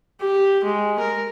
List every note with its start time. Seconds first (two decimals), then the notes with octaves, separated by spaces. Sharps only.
0.20 G4
0.64 G#3
0.99 A#4